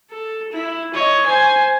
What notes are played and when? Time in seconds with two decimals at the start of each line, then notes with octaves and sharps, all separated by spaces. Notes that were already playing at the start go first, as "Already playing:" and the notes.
0.10 A4
0.52 E4
0.94 C#5 D#5
1.26 C5 G#5